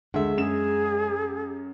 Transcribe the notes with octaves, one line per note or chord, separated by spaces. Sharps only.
D2 G#3 E5
F#2 G#4 E7